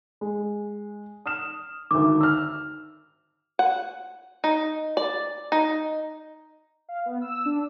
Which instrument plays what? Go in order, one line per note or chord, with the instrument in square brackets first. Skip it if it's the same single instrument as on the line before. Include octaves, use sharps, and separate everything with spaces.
[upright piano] G#3
D#6 F6 E7
[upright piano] D2 G#2 D#3 [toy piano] D6
[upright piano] E6 F6
[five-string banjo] F#5
D#4
D5
D#4
[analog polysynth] F5
B3
E6
D4